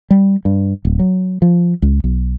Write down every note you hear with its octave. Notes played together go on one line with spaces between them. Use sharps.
G3
G2
D1
F#3
F3
C#2
B1